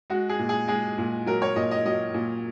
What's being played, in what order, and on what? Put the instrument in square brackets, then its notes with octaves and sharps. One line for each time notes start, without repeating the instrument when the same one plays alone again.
[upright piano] G#3 F#4
G#4
A#2
G#4
G#3 G#4
A#2
F#3 A#4
C#5
A#2 D#5
D#5
F#3 D#5
A#2